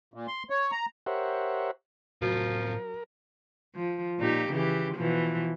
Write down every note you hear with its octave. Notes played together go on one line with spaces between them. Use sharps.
A#2
C6
C#5
A#5
G4 A#4 C5 C#5 E5 F#5
A2 C3 F3 F#3 A#4
F3
A#2 D#4 G4
C#3 E3 G4
B2 E3 F3